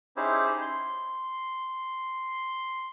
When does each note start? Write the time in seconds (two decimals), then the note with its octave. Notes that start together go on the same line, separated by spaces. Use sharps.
0.17 C#4 D#4 E4 G4 G#4 C5
0.62 C6